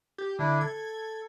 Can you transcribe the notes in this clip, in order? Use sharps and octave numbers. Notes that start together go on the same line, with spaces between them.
G4
D3 D4 E4
A4 G#6